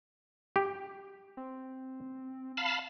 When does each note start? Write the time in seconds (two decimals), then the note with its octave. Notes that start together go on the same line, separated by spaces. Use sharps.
0.56 G4
1.37 C4
2.57 F5 A5 B5